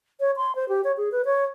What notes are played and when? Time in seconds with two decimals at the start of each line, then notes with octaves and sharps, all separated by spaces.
0.20 C#5
0.37 C6
0.56 C5
0.69 G4
0.84 C#5
0.97 G#4
1.12 B4
1.25 C#5